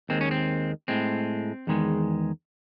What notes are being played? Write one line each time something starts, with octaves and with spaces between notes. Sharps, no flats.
D#2 D#3 G#3 C4
C#4
C4
A2 G#3 C4
E2 D#3 G#3